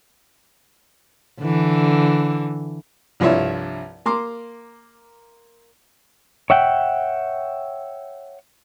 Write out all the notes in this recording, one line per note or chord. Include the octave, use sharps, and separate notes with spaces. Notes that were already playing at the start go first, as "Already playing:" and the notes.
D3 E3
C2 G2 F3 E4 C#5 E5
A#3 A#5 C6 D6
C#5 E5 F#5 G5